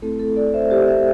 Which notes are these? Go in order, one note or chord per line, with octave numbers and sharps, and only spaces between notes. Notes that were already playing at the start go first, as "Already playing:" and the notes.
A3 C4 E4 A4
A4
A4 D5
C5 E5
G4 C5
C5 E5